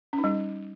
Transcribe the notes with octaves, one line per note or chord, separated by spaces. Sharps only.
C#4
D#4
G3